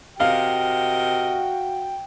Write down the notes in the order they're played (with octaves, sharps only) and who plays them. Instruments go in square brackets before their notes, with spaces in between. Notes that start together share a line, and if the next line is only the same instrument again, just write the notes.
[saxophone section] C3 A#4 D#5 [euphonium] F#4 [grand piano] F5 [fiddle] G5